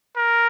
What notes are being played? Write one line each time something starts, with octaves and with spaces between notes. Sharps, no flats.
A#4